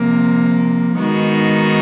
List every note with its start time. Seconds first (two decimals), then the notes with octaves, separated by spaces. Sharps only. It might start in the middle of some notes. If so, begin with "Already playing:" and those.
Already playing: C3 F3 A#3
0.97 D#3 G#3 B3 D#4 F#4